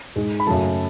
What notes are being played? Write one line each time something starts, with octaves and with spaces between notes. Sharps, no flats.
G#2 G#3
B5
F#2 C#3 F#3 A3 A5